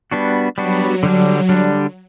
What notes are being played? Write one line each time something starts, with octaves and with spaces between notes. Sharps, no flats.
G3 B3 D4 F#4
F#3 G3 B3 D4 F#4
D3 G3 D4
D3 G3 D4